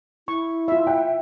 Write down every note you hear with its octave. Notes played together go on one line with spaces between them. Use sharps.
E4 C#6
F4 E5
E5 F#5 G5